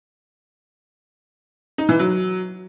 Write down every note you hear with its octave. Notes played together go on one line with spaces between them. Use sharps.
D#4
E3
F#3